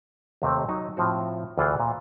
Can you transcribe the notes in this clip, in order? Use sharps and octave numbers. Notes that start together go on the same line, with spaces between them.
D#2 C3 A3 C4
F#3 D#4
A2 F3 C4 F#4
D2 E3 F4 G#4 F#5 G5
A#2